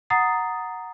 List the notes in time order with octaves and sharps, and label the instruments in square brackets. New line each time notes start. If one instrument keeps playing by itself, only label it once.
[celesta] F#5 A#5 D#6 A6 C7